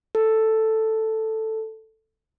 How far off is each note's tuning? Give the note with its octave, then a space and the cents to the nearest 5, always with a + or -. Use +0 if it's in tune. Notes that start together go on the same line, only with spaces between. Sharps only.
A4 +5